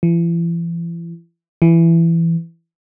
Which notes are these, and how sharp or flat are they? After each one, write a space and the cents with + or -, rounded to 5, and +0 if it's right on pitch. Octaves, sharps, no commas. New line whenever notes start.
E3 +40
E3 +15